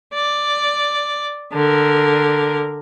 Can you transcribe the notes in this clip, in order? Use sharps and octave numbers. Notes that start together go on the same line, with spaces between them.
D5
D3 A#4